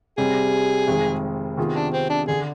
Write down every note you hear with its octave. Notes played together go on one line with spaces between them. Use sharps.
C3 G3 C4 G#4
F1 F2 D#3 G#3
C3 D#3 B3 F4 G#4
D4
C4
D4
D3 G#4